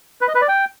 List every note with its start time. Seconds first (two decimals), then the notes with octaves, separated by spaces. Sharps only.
0.21 B4
0.28 D#5
0.35 B4
0.41 D5
0.48 G5